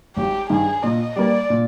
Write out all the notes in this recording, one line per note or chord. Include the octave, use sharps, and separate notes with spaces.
G#1 G4
G2 D#3 G#4
A#2 D#5
G3 A#3 D5
A#2